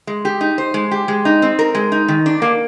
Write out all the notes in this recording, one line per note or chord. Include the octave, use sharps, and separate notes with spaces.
G#3
G4
D#4
C5
G#3
G4
G#3
D#4
C4
A#4
G#3
D#4
D#3
D4
A#3